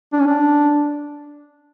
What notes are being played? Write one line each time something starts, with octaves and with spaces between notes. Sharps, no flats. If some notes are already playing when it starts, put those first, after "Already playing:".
D4
C#4
D4